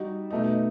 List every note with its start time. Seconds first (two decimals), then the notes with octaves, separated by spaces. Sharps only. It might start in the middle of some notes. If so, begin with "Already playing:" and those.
Already playing: G3 D#4 F#4
0.31 B2 A3 D#4